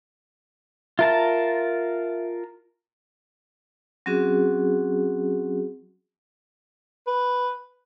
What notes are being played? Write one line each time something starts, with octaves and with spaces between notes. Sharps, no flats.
F4 A#4 E5 A5
F#3 C4 C#4 F#4 G#4
B4